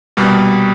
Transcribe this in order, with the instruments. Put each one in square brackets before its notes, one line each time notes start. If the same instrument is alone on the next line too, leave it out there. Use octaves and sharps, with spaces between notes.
[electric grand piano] C2 B2 G3 A#3